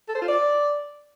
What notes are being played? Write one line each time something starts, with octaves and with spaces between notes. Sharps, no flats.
A4
C5
F4
D5